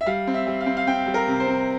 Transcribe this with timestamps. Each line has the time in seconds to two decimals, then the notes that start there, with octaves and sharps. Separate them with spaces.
0.01 E5
0.06 G3 F5
0.27 C4
0.34 E5
0.47 G3
0.61 F5
0.66 C4
0.77 F5
0.87 C4 G5
1.07 G3
1.14 A#4
1.28 C3
1.40 C5
1.47 C3